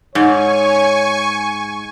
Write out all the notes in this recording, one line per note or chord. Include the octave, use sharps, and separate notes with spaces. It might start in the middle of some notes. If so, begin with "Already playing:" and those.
G#2 C#5 G#5 C#6